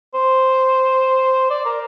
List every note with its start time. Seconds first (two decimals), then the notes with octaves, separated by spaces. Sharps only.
0.14 C5
1.50 D5
1.65 A#4